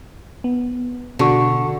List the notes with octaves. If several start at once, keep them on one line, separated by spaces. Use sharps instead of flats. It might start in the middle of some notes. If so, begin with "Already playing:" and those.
B3
B2 D3 F#4 C#6